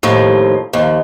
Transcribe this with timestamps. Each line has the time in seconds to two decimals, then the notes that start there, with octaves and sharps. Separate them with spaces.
0.03 D#2 A2 F3
0.73 D#2 F3